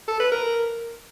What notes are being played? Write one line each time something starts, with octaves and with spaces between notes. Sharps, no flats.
A4
B4
A#4